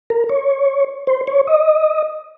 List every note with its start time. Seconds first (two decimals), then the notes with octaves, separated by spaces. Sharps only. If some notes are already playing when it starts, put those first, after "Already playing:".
0.10 A#4
0.29 C#5
1.07 C5
1.27 C#5
1.47 D#5